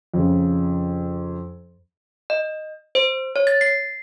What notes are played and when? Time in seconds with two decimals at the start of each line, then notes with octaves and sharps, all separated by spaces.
0.14 F2 C#3
2.30 D#5
2.95 C5
3.36 C#5
3.47 A6
3.61 C7